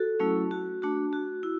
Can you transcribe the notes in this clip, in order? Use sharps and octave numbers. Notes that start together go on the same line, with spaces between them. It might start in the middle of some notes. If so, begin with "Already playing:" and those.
Already playing: F#4 A4
F#3 A3 C#4 E4
F#4
A3 D4 F#4
F#4
E4